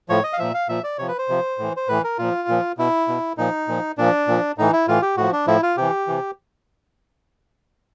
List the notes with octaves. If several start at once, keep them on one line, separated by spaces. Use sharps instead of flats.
A2 F3 C#5
D#5
F5
A#2 F3 E5
F5
A#2 F3 E5
D5
C3 F3 C#5
B4
C5
C3 F3
A2 E3
C5
A2 E3 B4
A#4
A#2 F3 F4
A#2 F3
B2 E4
B2
A#2 F3 D#4
A#2 F3
A#2 F3 D4
A#2 F3
A2 E3 D#4
E4
A2 E3 F4
G4
A2 F3 F#4
D4
A2 F3 E4
F4
C3 E3 G4
C3 E3